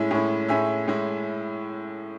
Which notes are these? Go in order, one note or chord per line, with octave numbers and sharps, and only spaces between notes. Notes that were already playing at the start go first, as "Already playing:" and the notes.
Already playing: A2 G#3 C#4 E4 E5 G#5
A2 G#3 C#4 E4
A2 G#3 C#4 E4 E5 G#5
A2 G#3 C#4 E4